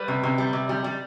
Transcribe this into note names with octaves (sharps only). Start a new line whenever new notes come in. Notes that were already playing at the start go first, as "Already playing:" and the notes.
Already playing: G3 B4
C3
C3
G3
C3
G3
G3